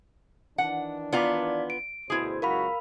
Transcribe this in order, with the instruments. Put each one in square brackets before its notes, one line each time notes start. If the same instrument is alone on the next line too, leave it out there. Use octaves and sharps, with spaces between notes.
[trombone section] D#3 E3 D4 [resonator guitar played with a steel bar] F#5
[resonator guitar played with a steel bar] B3 F4 A#5 [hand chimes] D5 F5 D6
[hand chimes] D7
[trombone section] D2 B2 C5 [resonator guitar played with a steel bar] E4 G#4
[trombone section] C#2 F#2 F#4 [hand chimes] A#4 F5 B5